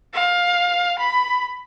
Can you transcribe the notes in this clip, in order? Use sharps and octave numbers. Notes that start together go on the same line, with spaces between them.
F5
B5